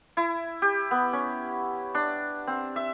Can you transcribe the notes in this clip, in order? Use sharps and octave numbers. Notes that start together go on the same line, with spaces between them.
E4
G4
B3
C#4
D4
C4
E5